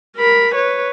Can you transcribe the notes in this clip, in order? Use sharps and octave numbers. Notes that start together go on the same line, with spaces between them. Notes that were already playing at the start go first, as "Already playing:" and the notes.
A#4 B5
B4 C#5